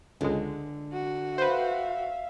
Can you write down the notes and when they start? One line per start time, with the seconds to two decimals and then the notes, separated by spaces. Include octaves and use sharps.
0.21 C#2 D3 G#3
0.94 F#4
1.38 B4 C5 E5 F5